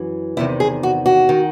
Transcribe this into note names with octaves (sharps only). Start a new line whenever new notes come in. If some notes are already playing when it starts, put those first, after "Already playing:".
Already playing: F#2 E3
E2 C3 D#3 E4
G#4
F#4
F#4
D#3